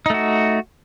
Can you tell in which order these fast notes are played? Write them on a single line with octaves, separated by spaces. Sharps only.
D#4 A3 F#4